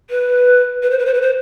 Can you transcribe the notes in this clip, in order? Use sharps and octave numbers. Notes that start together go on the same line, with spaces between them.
B4
B4
C5
B4
C5
B4
C5